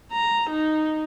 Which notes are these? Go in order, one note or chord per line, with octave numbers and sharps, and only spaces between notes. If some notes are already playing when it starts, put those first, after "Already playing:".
A#5
D#4